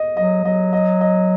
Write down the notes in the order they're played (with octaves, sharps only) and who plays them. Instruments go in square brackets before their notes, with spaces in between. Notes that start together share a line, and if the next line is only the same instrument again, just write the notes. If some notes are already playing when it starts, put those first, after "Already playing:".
Already playing: [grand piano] D#5
[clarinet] F#3 [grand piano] D#5
[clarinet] F#3 [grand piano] D#5
[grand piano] D#5
D#5